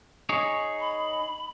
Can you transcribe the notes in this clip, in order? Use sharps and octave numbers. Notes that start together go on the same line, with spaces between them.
D#4 G#4 C#5
B5